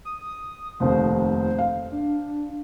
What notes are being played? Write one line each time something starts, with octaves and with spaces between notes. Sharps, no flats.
D#6
F1 D#2 C5
F5
D4